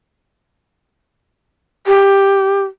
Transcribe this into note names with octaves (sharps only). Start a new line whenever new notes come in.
G4